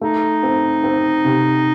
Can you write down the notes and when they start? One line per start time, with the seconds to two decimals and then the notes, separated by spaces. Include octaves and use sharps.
0.01 A3 D#4
0.43 C4
0.84 C4
1.25 C3